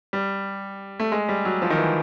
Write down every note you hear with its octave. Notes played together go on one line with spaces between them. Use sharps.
G3
A3
G#3
G3
F#3
F3
D#3
E3